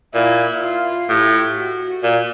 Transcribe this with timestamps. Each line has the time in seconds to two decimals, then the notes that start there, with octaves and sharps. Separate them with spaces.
0.14 A#2 E4
0.62 F4
1.09 A2 G4
1.56 F#4
2.03 A#2